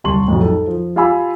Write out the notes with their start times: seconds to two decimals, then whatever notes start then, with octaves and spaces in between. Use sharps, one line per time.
0.04 D#1 C2 A5 C6 C#6 F#7
0.28 B1 F2 A2
0.42 D#4 A4
0.67 F3
0.96 F4 G4 F5 G#5 B5 E6